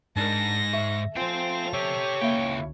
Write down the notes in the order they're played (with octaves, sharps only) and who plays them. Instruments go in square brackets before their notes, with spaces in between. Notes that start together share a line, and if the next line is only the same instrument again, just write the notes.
[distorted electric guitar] G#2 [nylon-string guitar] D4 A#4 [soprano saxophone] A5 [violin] A#6
[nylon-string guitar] E5 [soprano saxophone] C#6
[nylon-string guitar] F3 G#5 [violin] A3 F7 [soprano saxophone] F4 [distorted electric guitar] C5 G5
[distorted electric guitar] G4 E5 [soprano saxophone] C#5
[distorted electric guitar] C#2 G5 [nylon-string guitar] A#3 E4 E5